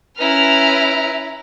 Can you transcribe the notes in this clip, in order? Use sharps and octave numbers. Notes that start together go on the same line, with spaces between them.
C#4 E4 B4 A#5 F6